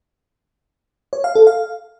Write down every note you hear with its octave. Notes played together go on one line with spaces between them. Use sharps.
C#5
F5
A4
F5